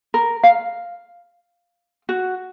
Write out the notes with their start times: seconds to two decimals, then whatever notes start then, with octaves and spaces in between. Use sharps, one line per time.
0.14 A#4
0.43 F5
2.09 F#4